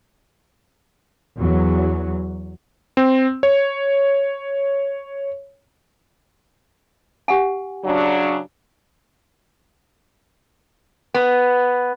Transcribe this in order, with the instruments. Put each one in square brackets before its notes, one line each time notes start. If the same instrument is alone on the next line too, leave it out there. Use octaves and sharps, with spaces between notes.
[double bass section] E2 F#3
[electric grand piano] C4
C#5
[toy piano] G4 F#5 G#5
[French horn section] C#3 F#3 D4
[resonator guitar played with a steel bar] B3